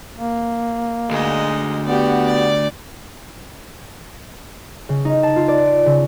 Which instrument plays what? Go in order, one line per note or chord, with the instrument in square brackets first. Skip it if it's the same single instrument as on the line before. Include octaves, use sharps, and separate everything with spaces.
[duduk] A#3
[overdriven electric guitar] D2 [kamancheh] G#3 D#5 [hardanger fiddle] D#4
[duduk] B3 [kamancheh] F#4 G4 [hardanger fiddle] D5
[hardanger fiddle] D5
[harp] C#3
D#4
A5
F4
D5
D7
C#3